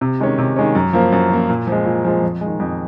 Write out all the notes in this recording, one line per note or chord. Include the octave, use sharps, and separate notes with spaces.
C3
D#3 G#3 C#4
C3
D#3 G#3 C#4
F#2
F3 A#3
F#2
F3 A#3
A#2
F3
G#3
A#2
F3 G#3
F2
G#3
D#3
F2